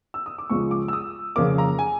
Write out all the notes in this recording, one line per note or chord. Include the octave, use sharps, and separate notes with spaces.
E6
D#6
D6
C#2 C#3 F3 G#3 C#6
D6
E6
D#6
F2 C#3 F3 A#3 D6
A#5
G#5